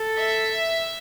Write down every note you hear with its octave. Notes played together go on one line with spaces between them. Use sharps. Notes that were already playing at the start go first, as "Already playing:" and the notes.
Already playing: A4
E5